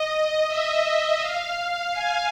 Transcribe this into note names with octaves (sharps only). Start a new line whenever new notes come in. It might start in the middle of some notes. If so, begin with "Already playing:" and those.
Already playing: D#5
E5
F5
G#5